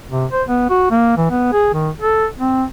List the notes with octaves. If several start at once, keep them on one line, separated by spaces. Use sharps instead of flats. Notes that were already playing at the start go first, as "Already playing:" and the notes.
C3
C5
B3
F#4
A#3
E3
B3
G#4
D#3
A4
C4